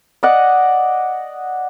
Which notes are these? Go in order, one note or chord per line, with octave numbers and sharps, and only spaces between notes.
D5 D#5 F#5